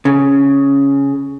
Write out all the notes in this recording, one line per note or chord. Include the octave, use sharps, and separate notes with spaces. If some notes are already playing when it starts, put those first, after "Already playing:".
C#3